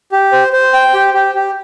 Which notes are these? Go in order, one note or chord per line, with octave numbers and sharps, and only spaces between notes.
G4
C5
C5
G5
G4
G4
G4